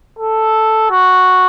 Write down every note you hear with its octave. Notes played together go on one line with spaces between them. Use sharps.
A4
F#4